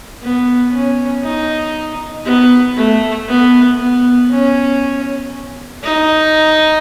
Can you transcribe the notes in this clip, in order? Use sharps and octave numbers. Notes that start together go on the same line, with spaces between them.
B3
C#4
D#4
B3
A3
B3
B3
C#4
D#4